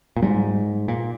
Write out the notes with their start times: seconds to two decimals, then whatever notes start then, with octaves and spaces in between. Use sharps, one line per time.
0.17 A#2
0.22 G#2 G3
0.88 A#2